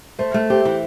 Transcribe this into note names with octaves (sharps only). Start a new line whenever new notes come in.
A3 C5
A3
G4 C5
E3